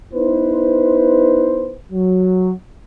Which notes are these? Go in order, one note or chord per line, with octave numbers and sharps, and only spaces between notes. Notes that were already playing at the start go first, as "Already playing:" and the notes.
B3 D#4 E4 B4 C5
F#3